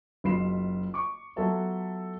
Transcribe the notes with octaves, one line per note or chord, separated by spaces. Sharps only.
F#1 B1 F4 B5 C7 E7
C#6 D6
F#3 B3 F4 A4 E5